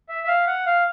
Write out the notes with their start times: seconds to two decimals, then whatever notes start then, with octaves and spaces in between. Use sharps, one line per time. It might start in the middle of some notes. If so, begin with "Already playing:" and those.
0.09 E5
0.24 E5
0.28 F5
0.47 F#5
0.66 F5